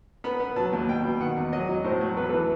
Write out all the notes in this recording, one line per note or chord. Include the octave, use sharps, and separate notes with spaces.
B3 B5
B3
F#3 A5
D#2
B2 G5
B2
D#3 F#5
E2
F#3 D#5
F#3
A2 C5
F#3
E2 B4
E3 A4